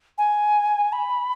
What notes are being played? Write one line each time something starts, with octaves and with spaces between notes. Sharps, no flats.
G#5
B5